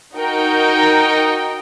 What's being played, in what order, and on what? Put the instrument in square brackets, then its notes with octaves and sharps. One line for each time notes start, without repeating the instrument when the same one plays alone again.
[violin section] D#4 F#4 A#4 D#5 G5